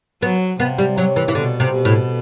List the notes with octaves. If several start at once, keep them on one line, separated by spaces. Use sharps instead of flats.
F#3 B3
C3 B3
G3
F#3
E3
E3
B2 D3
C3
B2
A2